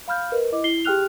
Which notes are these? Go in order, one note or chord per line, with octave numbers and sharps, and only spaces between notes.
F5 B5 F6 G6
A#4 B4 D#5
E4 D#5 D6
E4 C7 G7
G4 G#4 G5 F6 F#6 F7